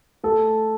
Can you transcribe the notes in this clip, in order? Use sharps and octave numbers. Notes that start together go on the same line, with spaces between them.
A3 A4